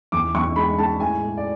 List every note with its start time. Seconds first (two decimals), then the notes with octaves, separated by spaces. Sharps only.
0.12 E2 D6
0.35 E2 C#6
0.56 G#3 B5
0.78 G#3 A5
1.00 A2 G#5
1.21 G#3
1.37 D5